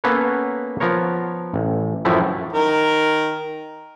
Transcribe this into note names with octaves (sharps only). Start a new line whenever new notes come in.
A#3 B3 C#4 A4 B4 C#5
F3 B3 A#4 C#5
A1
F#2 A2 E3 F3 A3 E4
D#3 A#4